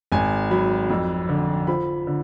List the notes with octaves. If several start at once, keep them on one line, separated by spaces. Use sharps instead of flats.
G#1 G#5
F#3 B5
F2
D3
F3 B5
D3